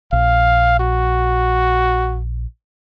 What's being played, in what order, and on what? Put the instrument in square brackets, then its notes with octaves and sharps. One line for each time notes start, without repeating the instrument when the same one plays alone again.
[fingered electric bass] A#1 [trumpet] F5
[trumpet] F#4